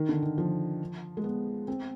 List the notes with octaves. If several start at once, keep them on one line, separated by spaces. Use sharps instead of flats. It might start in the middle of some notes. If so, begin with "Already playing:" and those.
Already playing: D#3
D3
D#3
F3
G#3
B3
C4